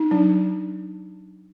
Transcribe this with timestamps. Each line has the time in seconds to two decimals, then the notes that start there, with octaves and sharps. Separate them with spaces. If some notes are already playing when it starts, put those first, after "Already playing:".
Already playing: D#4
0.11 F#3 D4